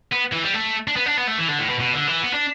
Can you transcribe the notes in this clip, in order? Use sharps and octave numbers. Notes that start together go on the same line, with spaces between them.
B3
E3
G3
A3
D4
B3
D4
B3
A3
E3
D3
A2
B2
B2
D3
E3
B3
D4